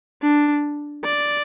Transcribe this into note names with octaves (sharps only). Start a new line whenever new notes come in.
D4
D5